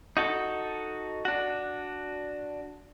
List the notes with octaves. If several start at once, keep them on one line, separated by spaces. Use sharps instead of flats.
D#4 F#4 A4
D4 F#4